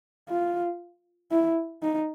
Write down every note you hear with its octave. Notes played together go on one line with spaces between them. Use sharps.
F4
E4
D#4